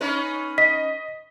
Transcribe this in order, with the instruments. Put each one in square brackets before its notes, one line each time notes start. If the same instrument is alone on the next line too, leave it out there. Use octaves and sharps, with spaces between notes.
[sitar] C#4 D#4 B4
[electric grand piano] D#5 [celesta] B6